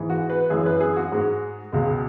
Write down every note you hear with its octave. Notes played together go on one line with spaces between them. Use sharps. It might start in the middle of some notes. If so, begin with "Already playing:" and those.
Already playing: G#2 E3 G#3
F#4
B4
F#2 E3 G#3 G#4
B4
G#4
F#4
G#2 G#3
C#2 B2 G#3